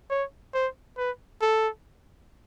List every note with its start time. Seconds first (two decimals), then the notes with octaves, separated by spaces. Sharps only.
0.10 C#5
0.54 C5
0.98 B4
1.42 A4